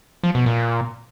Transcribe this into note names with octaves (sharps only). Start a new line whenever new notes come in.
F3
B2
A#2